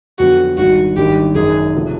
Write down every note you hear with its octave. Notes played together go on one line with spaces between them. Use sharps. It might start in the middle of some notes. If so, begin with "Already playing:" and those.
F2 D3 F#3 B3 F#4
G#1 G2 D#3 F#4
G#1 G2 D#3 G4
G#1 F#2 D#3 F#3 G#4
D2 C3 F3 A3